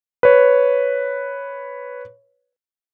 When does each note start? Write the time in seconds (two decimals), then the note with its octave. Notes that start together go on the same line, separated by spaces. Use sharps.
0.23 B4 C#5